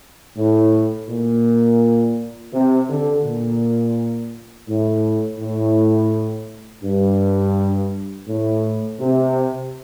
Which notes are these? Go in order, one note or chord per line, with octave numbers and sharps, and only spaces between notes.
A2
A#2
C3
D3
A#2
A2
A2
G2
A2
C3